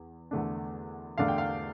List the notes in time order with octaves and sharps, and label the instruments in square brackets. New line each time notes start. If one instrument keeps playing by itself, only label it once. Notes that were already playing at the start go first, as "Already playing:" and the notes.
Already playing: [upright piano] E2
E2 D3 A3 D4
E2 D3 A3 D4 F5
G5
F5